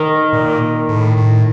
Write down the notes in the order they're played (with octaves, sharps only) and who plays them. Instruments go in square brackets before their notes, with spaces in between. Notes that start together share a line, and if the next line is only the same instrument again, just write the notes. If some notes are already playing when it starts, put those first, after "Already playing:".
Already playing: [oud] D#3
[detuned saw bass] A#2
A2
A2